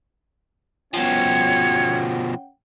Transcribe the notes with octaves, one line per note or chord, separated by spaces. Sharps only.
B2 F3 C#4 C#5 F#5 G5